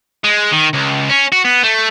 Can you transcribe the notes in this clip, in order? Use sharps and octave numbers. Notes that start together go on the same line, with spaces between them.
G#3
D#3
C#2
C#4
F#4
B3
A3